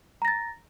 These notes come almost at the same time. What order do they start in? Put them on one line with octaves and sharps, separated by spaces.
A#5 A#6 A6